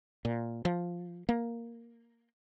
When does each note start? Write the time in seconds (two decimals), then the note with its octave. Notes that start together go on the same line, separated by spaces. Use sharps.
0.25 A#2
0.65 F3
1.29 A#3